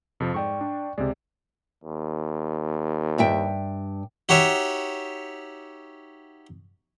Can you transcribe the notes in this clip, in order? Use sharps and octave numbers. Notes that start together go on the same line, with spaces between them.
F2 C3 F3
G#2 D5 G5 C#6
D4
C#2 C3 G#3 D5
D#2
G2 E5 G5
D#4 F#4 G4 C#5 E5